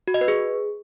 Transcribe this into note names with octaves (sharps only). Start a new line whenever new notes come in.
F#4
D#5
B4
G#4